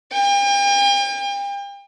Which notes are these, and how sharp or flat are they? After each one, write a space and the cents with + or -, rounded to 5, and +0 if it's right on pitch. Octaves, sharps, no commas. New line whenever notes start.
G5 +40